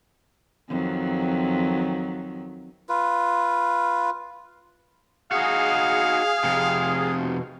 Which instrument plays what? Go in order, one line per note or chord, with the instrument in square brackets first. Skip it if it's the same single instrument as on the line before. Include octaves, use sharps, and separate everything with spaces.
[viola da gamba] F2 D#3 F#3
[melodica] F4 B4
[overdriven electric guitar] D#4 F#4 [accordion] G#4 [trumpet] F5
[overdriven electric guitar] F2 C3
[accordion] B2